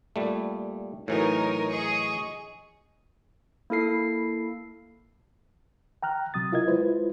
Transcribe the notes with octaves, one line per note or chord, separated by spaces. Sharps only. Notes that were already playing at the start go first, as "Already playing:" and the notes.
A#2 G3 A3
A2 E3 F#3 D#4 A#4 C#5
G#4 D#5 C#6
A#3 E4 A4 C7
G5 A#5 F6 F#6
C3 F#3 D#6 A6
E4 F4 A#4 D#5 G#6
G#3 E4 F4 B4 C5